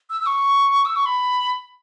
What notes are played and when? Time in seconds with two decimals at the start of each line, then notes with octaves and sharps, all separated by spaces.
0.10 E6
0.21 E6
0.26 C#6
0.85 E6
0.96 C#6
1.06 B5